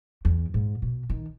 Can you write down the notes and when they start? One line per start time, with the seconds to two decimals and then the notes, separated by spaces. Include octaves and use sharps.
0.25 E2
0.54 G#2
0.82 B2
1.10 D#3